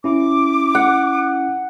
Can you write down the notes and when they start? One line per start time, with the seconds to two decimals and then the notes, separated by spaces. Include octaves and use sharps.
0.04 C#4 E4 D6
0.75 F#5